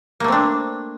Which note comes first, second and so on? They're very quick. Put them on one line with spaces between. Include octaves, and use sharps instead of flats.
A#3 A3 C4 D4